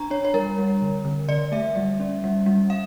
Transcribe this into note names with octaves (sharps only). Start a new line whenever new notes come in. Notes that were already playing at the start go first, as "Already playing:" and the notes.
Already playing: D4 A#5
D4 C#5
C#5
G3 A#4
G3
D3
D3
D3 D5
A3 E5
G3
C#4
G3
G3
F5